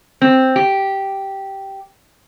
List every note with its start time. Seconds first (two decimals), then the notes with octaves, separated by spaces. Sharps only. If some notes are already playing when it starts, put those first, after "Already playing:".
0.22 C4
0.56 G4